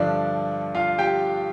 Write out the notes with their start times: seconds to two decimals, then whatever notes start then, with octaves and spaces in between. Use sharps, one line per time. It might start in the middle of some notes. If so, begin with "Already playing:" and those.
Already playing: G2 D3 F3 D4 D5
0.75 F4 F5
0.98 G4 G5